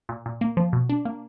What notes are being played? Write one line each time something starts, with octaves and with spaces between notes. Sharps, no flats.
A#2
A#2
A#3
F3
B2
D4
A#3